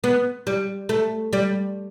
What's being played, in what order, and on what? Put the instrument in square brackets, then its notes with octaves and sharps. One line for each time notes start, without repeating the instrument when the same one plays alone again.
[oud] B3
G3
A3
G3